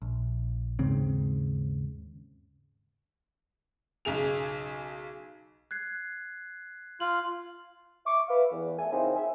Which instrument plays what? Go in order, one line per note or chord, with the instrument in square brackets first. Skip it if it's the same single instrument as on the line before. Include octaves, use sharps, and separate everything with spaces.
[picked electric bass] A#1
D#2 G#2 C#3 C4
[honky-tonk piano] B1 C#3 G#4 F7
[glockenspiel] F#6 G#6 C7
[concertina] F4 [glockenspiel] F#7
[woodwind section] E5 C#6 D6
B4 E5 F5
E2
A3 E4 G#4 A4 G#5
C#3 F3 A#3 C4 D#4 E4
E5 G#5